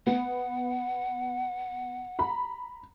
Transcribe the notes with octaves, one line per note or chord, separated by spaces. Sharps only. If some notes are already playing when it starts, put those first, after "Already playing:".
B3 F#5
A#5 B5